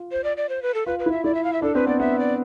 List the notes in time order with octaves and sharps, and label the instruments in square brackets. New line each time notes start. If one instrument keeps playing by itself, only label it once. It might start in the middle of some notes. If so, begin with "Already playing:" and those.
Already playing: [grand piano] F4
[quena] C5
D5
D5
C5
B4
A4
[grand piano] F4 [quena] B4
[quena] B4
[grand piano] E4
[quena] E5
[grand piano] E4 [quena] D5
[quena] E5
F5
E5
[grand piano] D4 [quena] A4
[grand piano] C4 [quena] B4
[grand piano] B3 [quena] D5
[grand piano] B3 [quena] E5
[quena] D5